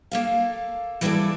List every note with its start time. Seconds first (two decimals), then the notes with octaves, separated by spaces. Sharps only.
0.11 A#3 A4 F5
1.01 E3 G3 E4 G#4 A4 D5